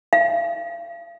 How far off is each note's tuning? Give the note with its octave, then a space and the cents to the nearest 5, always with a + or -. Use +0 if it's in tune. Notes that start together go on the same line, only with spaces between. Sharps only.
F5 -40